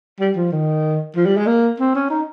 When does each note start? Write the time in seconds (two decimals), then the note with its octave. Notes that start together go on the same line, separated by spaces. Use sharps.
0.20 G3
0.36 F3
0.52 D#3
1.16 F3
1.26 G3
1.36 G#3
1.47 A#3
1.79 C4
1.95 C#4
2.10 D#4